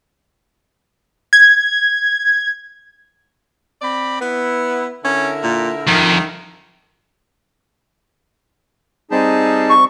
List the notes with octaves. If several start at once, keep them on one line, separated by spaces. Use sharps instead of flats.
G#6
C4 D5 B5
B3 E4
D3 C#4 E4 A#4
A#2
F2 D#3
G3 C4 D#4 G#4 A5
C#6